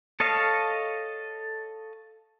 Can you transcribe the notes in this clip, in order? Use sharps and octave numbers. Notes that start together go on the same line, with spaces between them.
A4 C#5 D#5 F5 A5